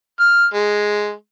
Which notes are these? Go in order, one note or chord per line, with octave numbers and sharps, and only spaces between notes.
F6
G#3